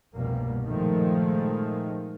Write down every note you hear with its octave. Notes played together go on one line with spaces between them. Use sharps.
F1 C2 G2 B2 G3 A#3
A#2 D#3 F3 G#3 A3